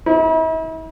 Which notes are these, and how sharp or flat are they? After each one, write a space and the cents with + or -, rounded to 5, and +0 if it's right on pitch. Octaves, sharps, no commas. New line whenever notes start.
E4 -45